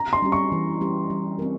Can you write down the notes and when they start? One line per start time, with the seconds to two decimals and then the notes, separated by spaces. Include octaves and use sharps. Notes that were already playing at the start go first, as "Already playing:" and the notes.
Already playing: A#5
0.13 C6
0.22 G3 C#4 G4
0.32 C#6
0.52 E3
0.81 G3 C#4 G4
1.10 G3
1.39 C4 G4 A#4